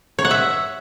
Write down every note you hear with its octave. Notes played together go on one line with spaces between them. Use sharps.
C#5
F#5
E5